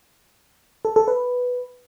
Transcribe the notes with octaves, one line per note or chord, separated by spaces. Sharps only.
A4
A4
B4